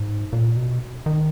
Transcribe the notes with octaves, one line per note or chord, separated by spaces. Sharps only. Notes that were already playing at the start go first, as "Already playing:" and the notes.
Already playing: G#2
A#2
B2
D#3